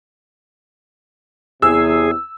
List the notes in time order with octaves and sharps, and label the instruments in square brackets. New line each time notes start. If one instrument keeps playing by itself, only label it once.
[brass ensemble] E2 C3 [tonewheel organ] G#4 [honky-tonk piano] E6